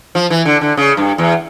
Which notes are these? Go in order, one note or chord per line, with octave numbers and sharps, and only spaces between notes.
F3
E3
D3
D3
C#3
G2
E2